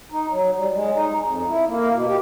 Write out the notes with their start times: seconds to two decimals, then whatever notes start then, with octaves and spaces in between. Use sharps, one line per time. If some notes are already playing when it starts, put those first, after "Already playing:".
0.12 D#4
0.31 F#3
0.57 G3
0.73 G#3
0.95 D#4
1.23 F2
1.48 E4
1.67 A#3
1.92 B2
2.08 G4